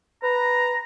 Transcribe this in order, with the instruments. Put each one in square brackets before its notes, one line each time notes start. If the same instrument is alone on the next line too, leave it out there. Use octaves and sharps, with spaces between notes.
[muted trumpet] B4 [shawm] A#5